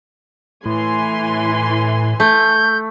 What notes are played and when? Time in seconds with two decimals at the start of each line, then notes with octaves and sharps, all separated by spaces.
0.66 A2 E3 G#5 C6
2.20 A3 G6